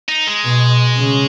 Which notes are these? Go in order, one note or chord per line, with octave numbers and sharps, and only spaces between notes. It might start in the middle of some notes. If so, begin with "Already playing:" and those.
D#4
G#3
B2
C#3